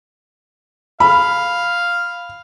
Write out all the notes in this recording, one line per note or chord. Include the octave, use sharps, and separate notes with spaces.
F5 B5